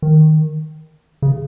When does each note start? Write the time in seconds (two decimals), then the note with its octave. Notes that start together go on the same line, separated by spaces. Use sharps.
0.02 D#3
1.22 C#3